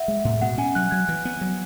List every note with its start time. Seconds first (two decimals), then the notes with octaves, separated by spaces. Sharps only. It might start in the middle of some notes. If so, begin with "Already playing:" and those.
Already playing: E5 F#5
0.08 G#3
0.25 A2
0.41 B2 F#5
0.58 C#4 G#5
0.75 F#3 F#6
0.91 F#3 G#6
1.09 E3
1.25 B3
1.41 F#3